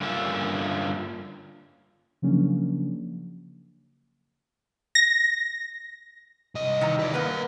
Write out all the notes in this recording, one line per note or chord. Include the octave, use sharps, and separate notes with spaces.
G2 D3 A#3 C#4 F4 E5
C#3 F3 F#3 A#3 C#4 D4
A#6
C2 D#5
D#3 E3 A#5
B4 D5
A#3 A#4 B4 F#5